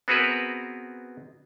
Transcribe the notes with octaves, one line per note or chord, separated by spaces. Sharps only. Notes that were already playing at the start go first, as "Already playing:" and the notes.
B3 C4 F#4 G#4 A#4 B4